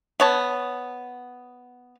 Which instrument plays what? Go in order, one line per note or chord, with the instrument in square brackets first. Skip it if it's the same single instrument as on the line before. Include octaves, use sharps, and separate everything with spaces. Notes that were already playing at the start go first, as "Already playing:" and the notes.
[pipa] B3 C#5 A5